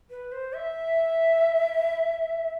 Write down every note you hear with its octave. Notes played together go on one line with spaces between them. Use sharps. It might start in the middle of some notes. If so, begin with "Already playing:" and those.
B4
C5
E5